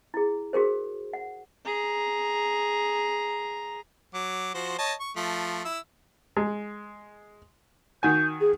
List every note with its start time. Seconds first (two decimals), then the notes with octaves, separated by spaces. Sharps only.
0.14 E4 G#4
0.53 F#4 G#4 A#4 C5
1.13 F#5
1.65 G#4 A#5
4.14 F#3 D6
4.54 F3 F#4 C5
4.78 C#5 D#5 A5
5.00 C#6
5.17 F3 A3
5.65 E4 E6
6.37 G#3
8.03 D#3 F#4 G#5 G6
8.40 G#4